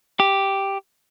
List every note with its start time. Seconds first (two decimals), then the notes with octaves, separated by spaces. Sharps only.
0.20 G4